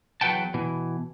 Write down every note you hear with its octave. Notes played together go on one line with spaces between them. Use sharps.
E2 F#3 B4 F#5 G5 A5
B2 E3